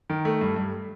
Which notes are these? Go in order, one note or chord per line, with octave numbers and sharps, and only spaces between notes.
D#3
A3
G2
G2